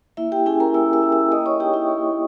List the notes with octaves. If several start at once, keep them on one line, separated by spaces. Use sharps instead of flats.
A#3 E4 E5
G4 G5
C#4 E4 G#4 G#5
A#4 A#5
A#3 E5 E6
E5 E6
C#4 E4
E5 E6
A#3 D#5 D#6
C#5 C#6
D#4 G4 G5
E4 E5
A#3